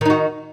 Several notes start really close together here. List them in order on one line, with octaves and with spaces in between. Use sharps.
D#3 D#4 F#4